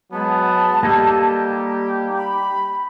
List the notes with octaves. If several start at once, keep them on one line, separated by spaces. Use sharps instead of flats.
F#3 G#3 B3 A5
G3 A#3 D#4 G4 A4
B5